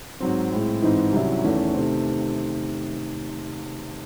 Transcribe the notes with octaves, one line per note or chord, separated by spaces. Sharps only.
G#2 F#3 C4
A2 G#3 C4
G#2 E3 C4 D#4
C2 C3 F#3 C#4 E4
E2 D#3 A3 C#4
C3 D#3 A3 C4